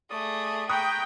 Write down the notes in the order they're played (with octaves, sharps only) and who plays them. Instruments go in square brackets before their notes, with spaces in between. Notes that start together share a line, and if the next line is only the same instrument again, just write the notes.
[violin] A3 G#4 [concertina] D5 D#6
[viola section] G5 [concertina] A#5 B5 C#6 [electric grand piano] D#6 F#6